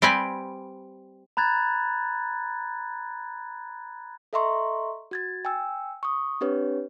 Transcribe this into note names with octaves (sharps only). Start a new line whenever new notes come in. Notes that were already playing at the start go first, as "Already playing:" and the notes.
G3 C4 G4 B4 G#5
A#5 B5 F#6 G#6 A6
A4 D#5 E5 A#5 C6 C#6
F#4 G#6 A6
G5 G#5 E6
C#6 D#6
C4 D4 G4 B4 C#5